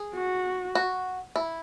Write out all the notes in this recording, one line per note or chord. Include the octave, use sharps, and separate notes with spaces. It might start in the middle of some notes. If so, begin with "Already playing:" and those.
Already playing: G#4
F#4
F#4
E4